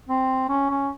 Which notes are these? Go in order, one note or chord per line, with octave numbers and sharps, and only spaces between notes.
C4
C#4
C#4